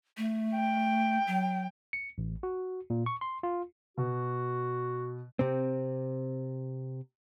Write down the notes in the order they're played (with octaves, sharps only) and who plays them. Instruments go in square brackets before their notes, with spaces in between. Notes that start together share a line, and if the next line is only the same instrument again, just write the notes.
[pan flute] A3
[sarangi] G5
[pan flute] F#3
[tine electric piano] C#7
A1
F#4
A#2
C#6
C6
F4
[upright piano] B2 [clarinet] F#4
[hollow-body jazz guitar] C3 C4